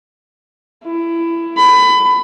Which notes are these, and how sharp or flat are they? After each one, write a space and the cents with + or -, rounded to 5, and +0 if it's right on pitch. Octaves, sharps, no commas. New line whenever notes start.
E4 +20
B5 +25